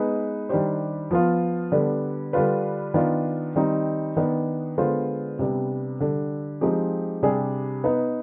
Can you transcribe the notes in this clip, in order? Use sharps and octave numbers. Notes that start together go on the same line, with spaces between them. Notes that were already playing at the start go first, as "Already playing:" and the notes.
Already playing: G#3 B3 D#4 B4
D#3 G3 D4 G4 C5
F3 B3 F4
D3 G3 B3 D4
D3 G3 D4 F4 B4
D#3 B3 D4 F4
D#3 G3 C4 D#4
D#3 B3 D4
D3 G#3 B3 F4 C5
C3 G3 B3 D4
D3 G3 D4
F3 G#3 C4 D#4 G4
C3 G3 D4 G#4
B3 D#4 B4